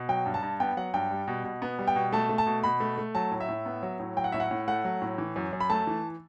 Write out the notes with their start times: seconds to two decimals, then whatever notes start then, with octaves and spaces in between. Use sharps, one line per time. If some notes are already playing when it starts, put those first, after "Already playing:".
Already playing: B2
0.09 F#3 G5
0.26 G2
0.34 A5
0.43 G2
0.60 B3 G5
0.77 F#3 F#5
0.94 G2 G5
1.11 G3
1.28 B2
1.44 B2
1.62 B3
1.79 G3
1.87 G5
1.96 B2
2.12 A3 A5
2.29 A3
2.38 A5
2.46 B2
2.63 B2 B5
2.80 A3
2.98 A3
3.15 F#3 A5
3.31 A2
3.40 E5
3.49 A2
3.66 B3
3.83 F#3
4.00 A2
4.16 F#3 G5
4.24 F#5
4.32 A2 E5
4.40 F#5
4.51 A2
4.68 A3 F#5
4.84 F#3
5.02 A2
5.18 E3
5.36 F#2
5.53 F#2
5.60 B5
5.70 A3 A5
5.87 E3